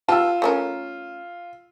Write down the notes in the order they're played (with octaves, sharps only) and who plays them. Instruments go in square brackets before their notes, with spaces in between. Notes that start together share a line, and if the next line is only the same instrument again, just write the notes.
[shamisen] B3 G4 A5 [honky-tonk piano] F4 E6
[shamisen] A3 C#4 A#4